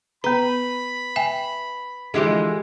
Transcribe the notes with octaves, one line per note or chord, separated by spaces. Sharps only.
B3 B4 A#5 B5
E5 G5 G#5
D3 E3 F3 G#3 E4 G4